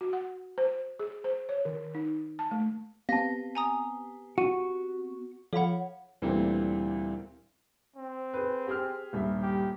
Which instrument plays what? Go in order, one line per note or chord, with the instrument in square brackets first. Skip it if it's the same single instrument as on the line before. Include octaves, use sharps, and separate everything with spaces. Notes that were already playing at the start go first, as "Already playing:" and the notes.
[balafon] F#4
F#5
C5
G#4
C5
C#5
D#3
D#4
A5
A3
[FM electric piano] B3 C4 G4 [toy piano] F5 A5 [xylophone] A#6
[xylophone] G#5 A#5 D#6
[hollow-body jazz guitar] F#4 [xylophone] D#7
[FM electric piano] F3 [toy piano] A4 F5 B5 [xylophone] C#5 F#5
[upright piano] D2 A#2 E3 G3 A#3 C4
[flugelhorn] C4
[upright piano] G#4 B4
G4 G#4 F6
D#1 G2 E5
[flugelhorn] G4